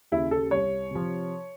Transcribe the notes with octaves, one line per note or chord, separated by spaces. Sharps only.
D#2 C#3 E4
A4
C2 C#5
C3 F3